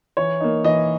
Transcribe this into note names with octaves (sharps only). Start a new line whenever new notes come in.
E3 C#5
A#3 D#4
E3 D#5